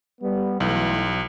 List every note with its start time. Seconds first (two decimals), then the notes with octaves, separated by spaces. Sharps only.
0.22 G3 B3
0.60 B1 E3 A3 E4